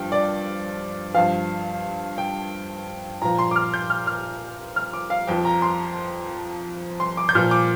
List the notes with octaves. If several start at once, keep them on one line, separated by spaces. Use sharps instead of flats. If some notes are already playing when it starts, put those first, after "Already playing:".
Already playing: G2 F3 G5
D5
G2 F3 F5
G5
A#2 F3 A#5
C6
D6
F6
G6
F6
F6
F6
D6
F5
F2 F3 G5
A#5
C6
C6
D6
G6
A#2 F3 F6
D6